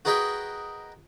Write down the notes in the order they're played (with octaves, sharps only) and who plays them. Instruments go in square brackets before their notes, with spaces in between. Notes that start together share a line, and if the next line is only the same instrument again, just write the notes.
[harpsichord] F#4 G#4 A#4 B4 D#5 G5